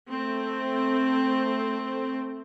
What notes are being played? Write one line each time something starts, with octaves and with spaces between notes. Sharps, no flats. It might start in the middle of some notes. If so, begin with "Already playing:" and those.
A3 C4